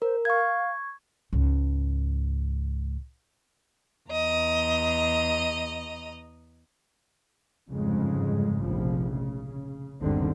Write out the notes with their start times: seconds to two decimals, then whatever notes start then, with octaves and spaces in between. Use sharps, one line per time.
0.02 A#4 C5
0.25 F5 C#6 G#6
1.33 C#2 G#2
4.08 E2 D#5 A#5
7.68 G1 F2 G#2 C#3 G#3
8.59 F1 A#1 F3
9.11 C#3
10.01 G1 D#2 G#2 D3 D#3 C4